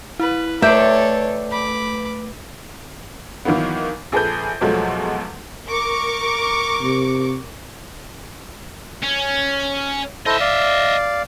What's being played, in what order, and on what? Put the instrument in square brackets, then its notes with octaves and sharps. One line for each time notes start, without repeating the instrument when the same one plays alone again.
[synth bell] E4 [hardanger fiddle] B4
[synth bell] A3 B4 [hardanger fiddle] A4 C#5 [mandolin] D5 G5 [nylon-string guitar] E5
[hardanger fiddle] B5 D6
[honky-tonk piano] D#3 E3 F#3 A#3 B3
A#1 G#4 A4 B4 G6
E2 B2 F3 F#3 G#3 A3
[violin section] A#4 C#6 D6
[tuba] C3
[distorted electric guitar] C#4
[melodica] E4 A4 C5 [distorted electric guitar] D#5 E5
[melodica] D5 F5